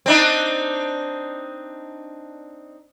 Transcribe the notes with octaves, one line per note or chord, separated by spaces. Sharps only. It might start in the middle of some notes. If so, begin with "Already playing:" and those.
C4 D4 D#4